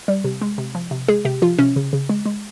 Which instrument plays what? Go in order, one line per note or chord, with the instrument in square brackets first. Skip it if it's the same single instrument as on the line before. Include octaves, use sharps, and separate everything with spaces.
[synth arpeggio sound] G3
C3
G#3
C3
F3
C3
G#3 G#4
C3 G4
F3 F4
C3 C#4
C#3
C#3
G#3
G#3